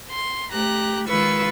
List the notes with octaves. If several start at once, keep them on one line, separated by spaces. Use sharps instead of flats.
C6
A3 G4 A#5 F#6
D#3 G#3 F4 B4 C#6 E6